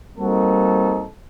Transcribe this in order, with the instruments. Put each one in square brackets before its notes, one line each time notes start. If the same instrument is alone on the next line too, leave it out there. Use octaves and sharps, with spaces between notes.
[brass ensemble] G3 A#3 C4 D#4 F#4 A4